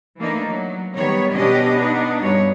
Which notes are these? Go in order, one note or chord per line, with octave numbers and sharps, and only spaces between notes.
E3 A3 A#3 D4 D#4
F#3
D#3 G3 B3 C#5
B2 C#4 D4 G4 D#5
B3 D4 D#4
G2 B2 C#5